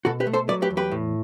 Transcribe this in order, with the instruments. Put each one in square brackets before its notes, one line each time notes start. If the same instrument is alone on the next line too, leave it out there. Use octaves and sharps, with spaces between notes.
[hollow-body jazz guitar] B2 F#4 A4
G4 B4
A3
A4 C5
F#3 B4 D5
G4 B4
E2
G4 B4
A2